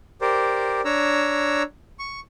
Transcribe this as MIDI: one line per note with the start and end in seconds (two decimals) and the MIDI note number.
0.21 0.81 67
0.21 0.81 70
0.21 0.81 72
0.21 0.81 74
0.85 1.63 62
0.85 1.63 73
0.85 1.63 82
0.85 1.63 88
1.99 2.20 85